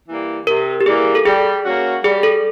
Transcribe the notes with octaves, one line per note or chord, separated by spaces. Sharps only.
E3 G3 A#3
C3 A#4
G4
E3 G3 A#3 G#4
A4
G3 G#4
A#3 C#4 F#4
G3 G#4
A4